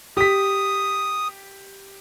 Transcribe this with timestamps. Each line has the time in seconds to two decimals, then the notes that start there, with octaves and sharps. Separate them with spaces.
0.17 G4 D#6 B6